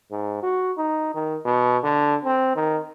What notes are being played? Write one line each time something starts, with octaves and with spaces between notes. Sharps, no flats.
G#2
F#4
D#4
D#3
B2
D3
C4
D#3